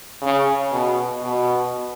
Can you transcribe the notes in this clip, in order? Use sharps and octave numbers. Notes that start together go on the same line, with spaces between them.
C#3
B2
B2